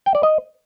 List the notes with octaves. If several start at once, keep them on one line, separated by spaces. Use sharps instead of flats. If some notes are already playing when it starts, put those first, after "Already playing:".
G5
D5
D#5